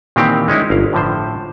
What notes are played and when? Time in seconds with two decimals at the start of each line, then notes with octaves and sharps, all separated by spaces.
0.16 A#2 D#3 E3 C4 G4
0.48 G#3 C#4 D#4 E4
0.70 G1 F5
0.93 A2 D3 F3 C5